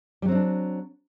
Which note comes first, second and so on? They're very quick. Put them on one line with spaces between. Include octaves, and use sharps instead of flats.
G3 F#3 C4 D#4 D4